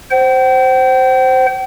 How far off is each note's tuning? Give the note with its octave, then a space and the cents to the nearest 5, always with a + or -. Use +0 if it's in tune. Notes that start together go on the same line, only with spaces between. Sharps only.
C5 +0 G5 -45